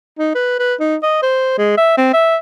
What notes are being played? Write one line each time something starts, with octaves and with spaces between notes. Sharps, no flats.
D#4
B4
B4
D#4
D#5
C5
G#3
E5
C4
E5